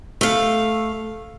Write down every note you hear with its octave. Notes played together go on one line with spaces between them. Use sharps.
A3 F5